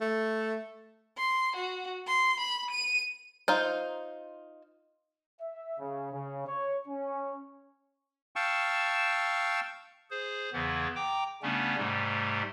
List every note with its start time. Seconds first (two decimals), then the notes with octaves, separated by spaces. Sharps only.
0.01 A3
1.18 C6
1.56 F#4
2.07 C6
2.40 B5
2.71 D#7
3.48 D#4 F4 C5
5.41 E5
5.79 C#3
6.12 C#3
6.46 C#5
6.88 C#4
8.36 F5 G5 A5 C#6 E6
10.10 G#4 C5
10.53 E2 C#3 E3 B3
10.95 G5 A#5 D6
11.42 C#3 G3 A3 B3 C#4 D4
11.77 G#2 C3 G3 A3